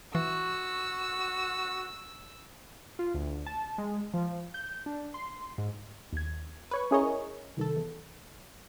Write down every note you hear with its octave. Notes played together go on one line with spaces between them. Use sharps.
E3 F#4 E6
F4
D2
A5
G#3
F3
G6
D4
C6
G#2
D#2 G#6
B4 C#5 C#6
C#4 E4 G#4 A#4 C#5 D#5
C2 D#3 A4
E2